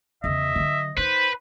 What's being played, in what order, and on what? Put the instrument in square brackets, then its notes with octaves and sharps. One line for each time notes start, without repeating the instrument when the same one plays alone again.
[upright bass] E2 C#3 [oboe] D#5 [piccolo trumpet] E5
[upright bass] D3 F#3
[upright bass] D#4 [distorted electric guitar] B4 [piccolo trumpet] C5